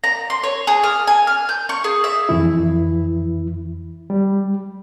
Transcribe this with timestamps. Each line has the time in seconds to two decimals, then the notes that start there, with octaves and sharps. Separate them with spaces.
0.04 A#5
0.30 C6
0.43 C#5
0.67 G#4
0.83 F6
1.07 G#5
1.27 F6
1.49 G6
1.69 C#6
1.84 G#4
2.04 E5
2.29 F2 E3 E4
4.10 G3